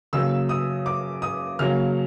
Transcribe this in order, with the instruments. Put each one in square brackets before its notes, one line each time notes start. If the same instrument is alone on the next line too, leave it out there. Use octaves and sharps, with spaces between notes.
[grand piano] C#3 F#3 A#3 E6
D#6
D6
D#6
C#3 F#3 A#3 F6